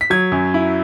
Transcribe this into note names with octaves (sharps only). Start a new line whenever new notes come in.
B6
F#3 G#6
F#2
E4